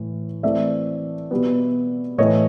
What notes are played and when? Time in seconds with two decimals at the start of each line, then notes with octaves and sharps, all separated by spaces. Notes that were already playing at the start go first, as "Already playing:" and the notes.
Already playing: A2 E3
0.43 E3 A3 C4 D5 E5
1.31 B2 G3 B3
2.18 A2 E3 A3 C#5 D#5